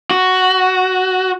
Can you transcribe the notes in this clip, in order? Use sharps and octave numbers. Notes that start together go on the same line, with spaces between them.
F#4